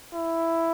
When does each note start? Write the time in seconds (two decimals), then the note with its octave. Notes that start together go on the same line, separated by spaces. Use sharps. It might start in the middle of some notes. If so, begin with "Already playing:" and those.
0.14 E4